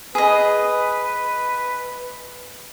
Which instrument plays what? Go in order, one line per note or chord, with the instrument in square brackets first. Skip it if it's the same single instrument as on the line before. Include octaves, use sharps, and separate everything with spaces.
[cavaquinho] G#4 D#5 [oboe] B4